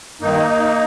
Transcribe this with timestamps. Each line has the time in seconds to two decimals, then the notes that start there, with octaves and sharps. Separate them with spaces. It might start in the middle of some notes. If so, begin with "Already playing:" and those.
0.21 G2 D#3 A#3 D#4